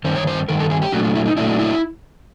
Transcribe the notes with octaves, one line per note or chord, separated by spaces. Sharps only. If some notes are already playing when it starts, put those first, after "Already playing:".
G2 D#3 C5
C#5
C5
G2 D#3 A#4
A4
G#4
G4
A#2 F#3 A3 D4 F#4
F4
E4
D#4
A#2 F#3 A3 D4 E4
E4